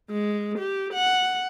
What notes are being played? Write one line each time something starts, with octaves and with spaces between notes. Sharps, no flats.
G#3
G4
F#5